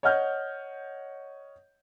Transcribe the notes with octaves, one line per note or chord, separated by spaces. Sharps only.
C#5 D#5 F#5 F6 G6